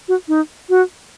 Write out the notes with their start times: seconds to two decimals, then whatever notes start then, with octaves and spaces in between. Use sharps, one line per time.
0.08 F#4
0.28 D#4
0.70 F#4